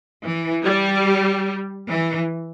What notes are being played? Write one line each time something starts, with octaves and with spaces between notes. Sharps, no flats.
E3
G3
E3